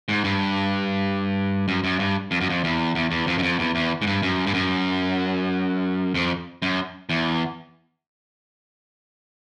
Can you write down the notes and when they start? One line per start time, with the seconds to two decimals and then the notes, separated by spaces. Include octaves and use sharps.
0.09 G#2
0.24 G2
1.68 F#2
1.84 F#2
1.99 G2
2.31 F2
2.41 F#2
2.49 F2
2.64 E2
2.95 E2
3.11 E2
3.27 F2
3.38 F#2
3.43 F2
3.59 E2
3.75 E2
4.02 G#2
4.07 G2
4.22 F#2
4.47 G2
4.54 F#2
6.15 F2
6.62 F#2
7.09 E2